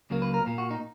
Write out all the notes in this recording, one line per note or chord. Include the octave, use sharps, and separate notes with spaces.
C#2 C#3 F#3 A#3
B4
A#4
A#2 A#3
F#4
D#4